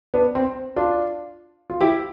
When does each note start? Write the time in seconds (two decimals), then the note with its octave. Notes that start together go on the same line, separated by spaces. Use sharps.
0.14 B3 D4
0.35 C4
0.76 D4 F4
1.70 F4
1.81 E4 G4